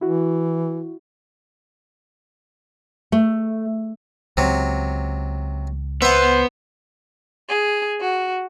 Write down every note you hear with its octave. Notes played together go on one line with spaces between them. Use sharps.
E3 E4 F#4
A3
C#2 C3 F#3
B3 B4 C5 E5 F#5
G#4
F#4